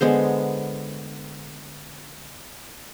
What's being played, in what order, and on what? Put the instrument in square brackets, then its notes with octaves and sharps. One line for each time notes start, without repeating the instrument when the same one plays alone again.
[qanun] D3 G#3 B3 C5